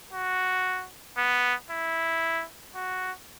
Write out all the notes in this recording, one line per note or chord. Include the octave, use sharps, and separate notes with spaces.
F#4
B3
E4
F#4